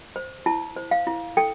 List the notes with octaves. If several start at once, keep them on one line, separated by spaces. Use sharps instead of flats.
C5
E4 A5
C5
F5
E4
A4 G5